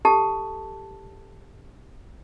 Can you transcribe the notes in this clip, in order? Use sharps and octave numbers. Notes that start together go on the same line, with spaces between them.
G4 A4 A5